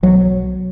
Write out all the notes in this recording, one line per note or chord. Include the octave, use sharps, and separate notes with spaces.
B1 F#3